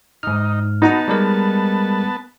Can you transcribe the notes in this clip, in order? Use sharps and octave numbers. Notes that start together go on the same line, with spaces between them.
G#2 D#4 F6
B3 D#4 F#4 F#5 A5 A#5
G3 G#3 A#4